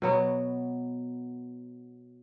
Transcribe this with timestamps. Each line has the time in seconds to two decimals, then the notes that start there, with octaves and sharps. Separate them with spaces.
0.02 B2 F#3 B3